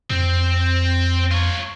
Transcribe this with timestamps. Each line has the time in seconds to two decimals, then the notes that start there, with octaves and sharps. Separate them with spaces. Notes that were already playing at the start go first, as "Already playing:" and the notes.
0.10 F2 C4
1.32 F4 C#5